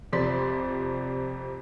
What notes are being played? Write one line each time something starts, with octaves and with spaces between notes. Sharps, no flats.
F2 C3 D5 C6 B6